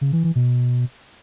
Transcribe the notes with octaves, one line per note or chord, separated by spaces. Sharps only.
C#3
E3
E3
B2